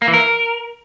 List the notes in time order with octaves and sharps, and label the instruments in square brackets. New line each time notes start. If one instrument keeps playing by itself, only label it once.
[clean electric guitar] A#3
E3
A#4